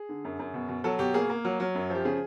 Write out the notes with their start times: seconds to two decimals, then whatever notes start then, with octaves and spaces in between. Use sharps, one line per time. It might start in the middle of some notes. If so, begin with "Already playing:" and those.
Already playing: G#4
0.09 D3
0.25 F#2
0.39 F#2
0.54 B2
0.69 B2
0.84 F#3 A4
0.99 B2 G4
1.14 A#3 G#4
1.30 A#3
1.45 F#3
1.60 F#3
1.75 F#2
1.90 F3 G4
2.05 C#3 G#4